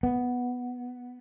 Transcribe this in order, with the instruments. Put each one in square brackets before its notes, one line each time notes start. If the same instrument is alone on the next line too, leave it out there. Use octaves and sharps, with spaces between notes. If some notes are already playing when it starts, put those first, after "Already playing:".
[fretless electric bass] B3